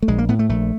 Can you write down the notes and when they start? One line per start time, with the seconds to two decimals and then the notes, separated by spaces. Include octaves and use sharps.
0.02 A3
0.08 A#1 G#3
0.18 A#3
0.29 A2 B3
0.39 A3
0.49 A#1 A3